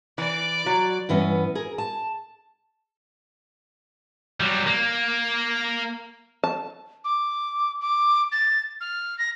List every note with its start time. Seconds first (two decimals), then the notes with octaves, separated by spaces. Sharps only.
0.18 E3 D5 D6
0.66 F#3
1.09 G2 E3 B3 C#4
1.55 G#4 A#4
1.78 A5
4.40 F#3 G3
4.66 A#3
6.44 A5
7.05 D6
7.81 D6
8.32 A6
8.81 F6
9.18 A#6